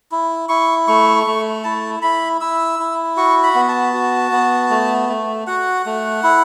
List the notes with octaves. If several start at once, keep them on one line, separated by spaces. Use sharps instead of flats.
E4
E4 C#6
A3 C#6
A3
E4 A5
E4 B5
E4 E6
E4
F#4 C#6
B5
B3
A5
F#4
B3
A3
A3
F#4 F#5
A3
E4